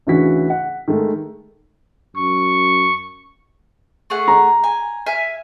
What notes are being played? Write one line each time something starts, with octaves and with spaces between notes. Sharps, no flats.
D2 C#3 E3 F#4 B6
F#5
D#3 G#3 A3
F#2 C#6
A3 G#4 F#5
A#5
G#5
E5 G#5 F6